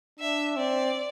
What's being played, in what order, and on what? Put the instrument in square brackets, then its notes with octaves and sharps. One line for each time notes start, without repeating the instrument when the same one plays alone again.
[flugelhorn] D4 [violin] E5
[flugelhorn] C4 [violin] D5